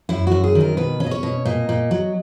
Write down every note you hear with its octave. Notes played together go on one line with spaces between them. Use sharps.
F#2 E4
F#2 F#4
G#4
D#3
A#4
B2 B4
C#4
D#5
C#5
B2
A#2 D#5
A#2
F#3